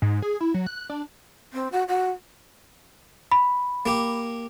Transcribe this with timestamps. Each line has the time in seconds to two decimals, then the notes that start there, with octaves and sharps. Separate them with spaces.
0.02 G#2
0.22 G#4
0.41 E4
0.54 F#3
0.66 F#6
0.90 D4
1.53 C4
1.72 F#4
1.88 F#4
3.32 B5
3.86 A#3 G4